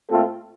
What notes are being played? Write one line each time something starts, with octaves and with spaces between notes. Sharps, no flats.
A#2 A3 C4 F4 A4